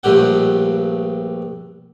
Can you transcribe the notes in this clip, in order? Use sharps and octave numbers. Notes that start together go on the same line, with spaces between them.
A#1 G2 A3 G4 F#5